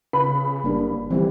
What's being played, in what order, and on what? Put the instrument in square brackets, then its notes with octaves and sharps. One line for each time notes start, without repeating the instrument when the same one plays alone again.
[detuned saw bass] C#3 [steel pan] F4 B4 [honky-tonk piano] B5
[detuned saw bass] F#1 [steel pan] G3 A#3 D4
[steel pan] D#3 G3 C4 [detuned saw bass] E3